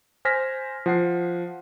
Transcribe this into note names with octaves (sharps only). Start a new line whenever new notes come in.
C5 G#5 F6 A#6 B6
F3 F#5 C7